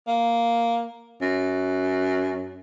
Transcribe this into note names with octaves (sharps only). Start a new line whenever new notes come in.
A#3
F#2